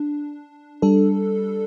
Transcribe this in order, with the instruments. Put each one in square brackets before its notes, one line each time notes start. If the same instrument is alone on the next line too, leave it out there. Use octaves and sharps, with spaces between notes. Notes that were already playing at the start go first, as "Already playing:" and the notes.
Already playing: [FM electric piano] D4
G3 D4 A4